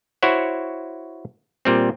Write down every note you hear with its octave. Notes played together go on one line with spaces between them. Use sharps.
E4 F#4 C5 C#5 F#5
A#2 G3 C4